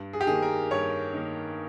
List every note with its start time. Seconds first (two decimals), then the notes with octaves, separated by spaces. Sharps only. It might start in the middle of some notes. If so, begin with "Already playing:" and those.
Already playing: G2
0.13 G#4
0.21 G4
0.27 D#3 A#3 G#4
0.42 A#4
0.71 G2 C#5
1.13 D#3 A#3